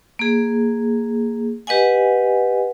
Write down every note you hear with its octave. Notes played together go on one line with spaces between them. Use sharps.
A#3 G#4
G4 B4 D#5 F#5 G#5